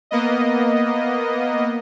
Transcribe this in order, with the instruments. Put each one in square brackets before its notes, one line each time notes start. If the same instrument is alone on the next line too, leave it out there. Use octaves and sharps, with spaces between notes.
[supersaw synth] A#3 B3 D#5